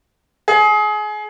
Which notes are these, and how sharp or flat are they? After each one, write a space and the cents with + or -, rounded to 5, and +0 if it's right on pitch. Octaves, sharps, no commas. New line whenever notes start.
G#4 +25